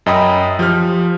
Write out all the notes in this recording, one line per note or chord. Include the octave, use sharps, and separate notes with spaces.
F#2 D#5 G5 B5 D#6
F3 G4 F6